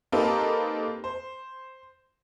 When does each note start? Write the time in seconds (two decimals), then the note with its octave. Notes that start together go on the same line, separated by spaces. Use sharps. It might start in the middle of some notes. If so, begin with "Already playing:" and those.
0.12 A#3 C4 D#4 G4 A4 B4
1.04 C5